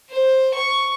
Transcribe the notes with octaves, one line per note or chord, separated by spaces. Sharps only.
C5
C#6